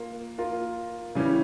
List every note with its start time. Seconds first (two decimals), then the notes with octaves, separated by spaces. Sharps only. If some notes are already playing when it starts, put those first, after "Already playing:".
Already playing: A#3 F4 A#4
0.38 A#3 F4 A#4
1.15 C#3 E3 G3 C#4 E4